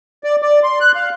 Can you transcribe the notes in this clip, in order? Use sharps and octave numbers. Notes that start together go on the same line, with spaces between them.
D5
D5
C6
F#6
F5